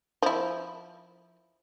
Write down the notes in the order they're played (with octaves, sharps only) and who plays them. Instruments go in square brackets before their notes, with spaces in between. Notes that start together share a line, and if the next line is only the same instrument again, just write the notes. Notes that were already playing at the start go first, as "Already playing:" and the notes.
[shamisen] F3 E4